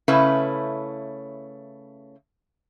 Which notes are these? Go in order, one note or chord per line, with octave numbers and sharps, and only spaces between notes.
C#3 A3 C#4 E4 B4